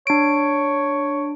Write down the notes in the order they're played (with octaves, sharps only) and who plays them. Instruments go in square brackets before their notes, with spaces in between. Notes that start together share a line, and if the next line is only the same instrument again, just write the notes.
[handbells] D4 D7 [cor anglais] C#5